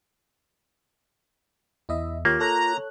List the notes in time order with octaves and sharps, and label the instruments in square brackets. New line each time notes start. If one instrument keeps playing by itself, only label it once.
[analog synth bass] E2 [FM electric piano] E4 D#5 E5
[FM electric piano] D#2 G4 C#5 [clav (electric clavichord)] A#3 [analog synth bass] F4
[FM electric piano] A4 C#5 F#6 [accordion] A#5